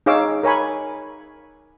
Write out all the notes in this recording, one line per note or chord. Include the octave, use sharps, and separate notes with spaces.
D#4 G#4 C#5 F5 D6 E6
A#4 C#5 G#5 B5